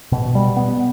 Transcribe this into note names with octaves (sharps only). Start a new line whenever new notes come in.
B2
G3
B3